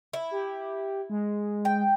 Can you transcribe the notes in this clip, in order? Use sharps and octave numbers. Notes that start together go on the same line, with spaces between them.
E4
G4
G#3
G5